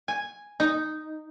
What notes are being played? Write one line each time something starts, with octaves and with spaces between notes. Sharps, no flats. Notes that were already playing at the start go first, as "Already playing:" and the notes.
G#5
D#4